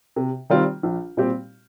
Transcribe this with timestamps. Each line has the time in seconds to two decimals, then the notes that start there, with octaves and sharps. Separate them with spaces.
0.16 C3
0.50 D#3 G3 C4 F4
0.83 A#1
1.17 A#2 G3 C4 G4